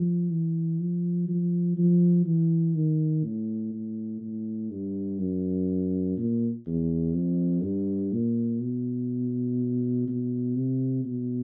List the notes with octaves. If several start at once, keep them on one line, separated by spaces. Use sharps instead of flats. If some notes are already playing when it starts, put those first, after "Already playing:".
Already playing: F3
E3
F3
F3
F3
E3
D#3
A2
A2
A2
G2
F#2
A#2
E2
F2
G2
A#2
B2
B2
C3
B2